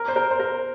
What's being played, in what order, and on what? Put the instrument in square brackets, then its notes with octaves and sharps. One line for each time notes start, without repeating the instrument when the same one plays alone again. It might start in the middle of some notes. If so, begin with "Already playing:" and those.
Already playing: [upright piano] A#4
C5
A#4
C5
A#4